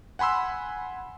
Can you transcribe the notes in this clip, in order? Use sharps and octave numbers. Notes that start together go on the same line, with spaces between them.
F#5 G#5 B5 C6 E6